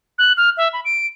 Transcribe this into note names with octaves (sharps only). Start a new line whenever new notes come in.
F#6
F6
E5
B5
D7